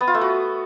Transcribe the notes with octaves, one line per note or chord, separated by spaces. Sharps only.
B3
F4
A3
F#4